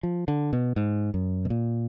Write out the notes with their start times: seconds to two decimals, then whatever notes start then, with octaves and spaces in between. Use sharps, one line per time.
0.03 F3
0.28 D3
0.53 B2
0.76 G#2
1.14 F#2
1.45 B2
1.50 A#2